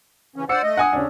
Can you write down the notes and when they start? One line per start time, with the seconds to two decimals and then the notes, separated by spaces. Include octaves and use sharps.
0.36 C#3 E3 C#4
0.49 C5 D5 F#5 E6 C#7
0.63 A3 D#5
0.77 F#5 G#5 D#6
0.93 D#2 C#3 C#4 D4